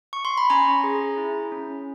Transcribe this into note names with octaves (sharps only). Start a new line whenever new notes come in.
C#6
C6
B5
C#4 G#5 A#5
G#4
E4
C#4